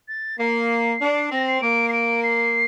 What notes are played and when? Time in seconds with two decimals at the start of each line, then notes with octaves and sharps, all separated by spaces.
0.08 A6
0.39 A#3 C7
1.00 D4
1.31 C4 A#6
1.47 C7
1.61 A#3 D7
1.89 C7
1.93 D7
2.23 C7